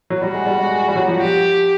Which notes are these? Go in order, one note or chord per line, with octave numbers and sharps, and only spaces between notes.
F#3
G3 F#4
G#3
G3
G#3
G#3
G3
F#3
F3
G4